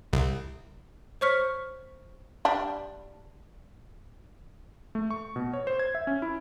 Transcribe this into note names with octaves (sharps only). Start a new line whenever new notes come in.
C2
C5 C#5 C#6 F6 B6 C#7
G3 D4
A3
C#6
B2
C#5
C5
G#6
E5
C#4
E4